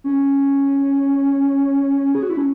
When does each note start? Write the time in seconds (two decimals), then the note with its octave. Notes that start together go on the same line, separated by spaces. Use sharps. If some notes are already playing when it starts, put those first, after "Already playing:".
0.04 C#4
2.15 G#4
2.23 F#4
2.30 E4
2.37 C#4